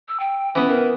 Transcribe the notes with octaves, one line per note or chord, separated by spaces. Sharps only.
E6
G5
E3 B3 C#4
A#4